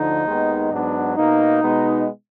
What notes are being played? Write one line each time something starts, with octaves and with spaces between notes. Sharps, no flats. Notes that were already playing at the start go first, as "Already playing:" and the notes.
Already playing: D2 D3 F3 D#4
D#2 D#3 G#3 B3
G#2 F#3 B3 D4
B2 A#3 D#4
B2 G#3 B3